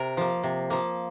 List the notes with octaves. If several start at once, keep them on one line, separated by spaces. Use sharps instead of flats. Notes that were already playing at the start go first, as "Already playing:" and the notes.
Already playing: C3 A#4
F3 A#3
C3
F3 A#3